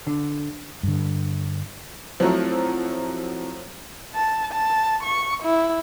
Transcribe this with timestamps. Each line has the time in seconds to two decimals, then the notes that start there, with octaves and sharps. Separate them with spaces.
0.07 D3
0.83 G2 D3
2.20 F3 F#3 A3 C4 E4
4.15 A5
4.52 A5
5.03 C#6
5.43 E4